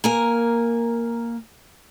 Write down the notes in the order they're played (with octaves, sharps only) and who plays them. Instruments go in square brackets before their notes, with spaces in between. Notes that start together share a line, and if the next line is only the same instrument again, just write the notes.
[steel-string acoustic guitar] A#3 A#4 G#5